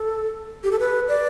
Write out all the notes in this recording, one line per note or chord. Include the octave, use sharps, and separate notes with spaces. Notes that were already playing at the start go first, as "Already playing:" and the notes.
Already playing: A4
G4
A4
B4
D5